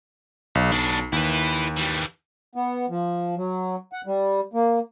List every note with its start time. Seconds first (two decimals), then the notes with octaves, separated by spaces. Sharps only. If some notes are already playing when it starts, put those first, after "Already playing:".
0.55 B1
0.72 B1 B3 D4
1.12 D#2 E4 B4
1.77 E3 G3
2.55 B3
2.89 F3
3.37 F#3
3.93 F#5
4.06 G3
4.53 A#3